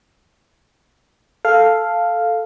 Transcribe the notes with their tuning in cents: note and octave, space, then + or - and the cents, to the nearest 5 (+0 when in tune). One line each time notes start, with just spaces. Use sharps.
A4 +0 F5 +0